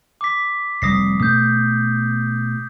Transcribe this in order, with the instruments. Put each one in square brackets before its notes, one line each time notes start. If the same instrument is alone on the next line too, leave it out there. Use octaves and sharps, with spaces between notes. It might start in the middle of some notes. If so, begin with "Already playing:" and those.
[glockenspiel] D6 B6
[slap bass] F1 G3 [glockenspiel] D#6 A#6 C7
[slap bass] B2 A3 B3 [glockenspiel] D#6 G6